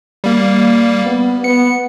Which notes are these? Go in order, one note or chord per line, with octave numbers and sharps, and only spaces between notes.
G3 A#3
B3
B3 C#7